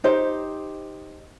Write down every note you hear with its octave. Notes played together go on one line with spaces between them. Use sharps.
D#4 G4 C5